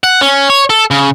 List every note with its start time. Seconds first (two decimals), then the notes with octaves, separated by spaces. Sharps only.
0.04 F#5
0.21 C#4
0.50 C#5
0.70 A4
0.91 C#3